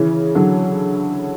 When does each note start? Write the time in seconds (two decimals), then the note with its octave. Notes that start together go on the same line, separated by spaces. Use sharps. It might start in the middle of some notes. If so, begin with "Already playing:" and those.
Already playing: C#3 E3
0.35 D3 F#3